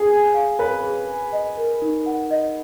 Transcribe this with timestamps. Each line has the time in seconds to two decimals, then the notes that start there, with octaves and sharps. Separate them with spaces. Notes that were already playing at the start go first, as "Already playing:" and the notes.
Already playing: G#4
0.10 G#5
0.34 F5
0.59 B4 C#5
0.83 G#4
1.08 G#5
1.32 D#5
1.57 A#4
1.82 D#4
2.06 F#5
2.31 D#5